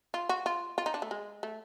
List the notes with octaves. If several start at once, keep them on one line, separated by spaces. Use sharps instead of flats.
F4
F#4
F4
F4
D#4
D4
A3
G#3
A3